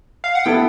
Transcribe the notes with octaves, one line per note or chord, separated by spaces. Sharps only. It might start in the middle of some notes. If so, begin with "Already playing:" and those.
F5
F#5
B3 E4 A4 G5